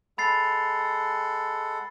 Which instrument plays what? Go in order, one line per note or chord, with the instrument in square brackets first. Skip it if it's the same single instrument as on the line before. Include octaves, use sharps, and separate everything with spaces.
[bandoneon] G#3 A4 F#5 [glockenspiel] B5 A6 C7